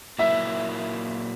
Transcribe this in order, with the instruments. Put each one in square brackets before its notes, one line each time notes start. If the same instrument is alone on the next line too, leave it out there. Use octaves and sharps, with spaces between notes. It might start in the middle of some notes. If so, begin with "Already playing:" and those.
[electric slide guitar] A#2 F#3 A#3 E4 [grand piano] E5